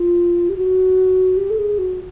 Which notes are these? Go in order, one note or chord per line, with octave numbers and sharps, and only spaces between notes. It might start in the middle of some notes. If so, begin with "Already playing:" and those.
Already playing: F4
G4
F#4
G4
A4
G#4
F#4